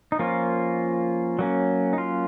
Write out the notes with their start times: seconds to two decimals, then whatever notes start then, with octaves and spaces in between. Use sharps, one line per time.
0.12 D#4
0.19 F3 A#3 C#4 F4
1.39 F#3 A#3 C#4
1.93 D#4
1.98 F4